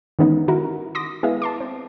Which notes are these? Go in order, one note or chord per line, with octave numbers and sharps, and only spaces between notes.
D#3 E3 G#3 B3 C#4 D#4
D#3 E4 F#4 A#4
C6 D6 D#6 A#6
G#3 B3 E4 E5 F5
A5 C6 D6
C4